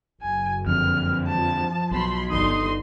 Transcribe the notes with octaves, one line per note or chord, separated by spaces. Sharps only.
F#1 G#5
F2 D3 F6
F3 A5
B1 B2 B5 C6
G1 D3 D#4 C6 D#6